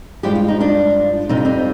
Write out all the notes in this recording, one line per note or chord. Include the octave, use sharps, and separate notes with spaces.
G2 F3 G#3 G4
F4
D#4
D4 F4
F2 C3 G3 D#4
F4
C4 D#4